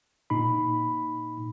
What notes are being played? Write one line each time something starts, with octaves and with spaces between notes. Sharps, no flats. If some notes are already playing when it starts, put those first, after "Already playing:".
A#2 D#4 B5